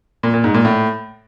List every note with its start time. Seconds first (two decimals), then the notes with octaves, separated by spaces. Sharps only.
0.23 A#2
0.34 A#2
0.44 G#2
0.54 A#2
0.65 A2